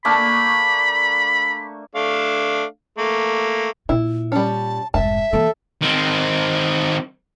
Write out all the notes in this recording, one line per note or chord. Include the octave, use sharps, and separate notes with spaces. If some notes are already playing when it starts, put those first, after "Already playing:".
A3 A#3 D4 B5
A3 D4 F5
A3 A#3
A#2 E4
G3 C#4 A5
F1 G#2 E5 A5
E3 A#3 A4
D#3 C4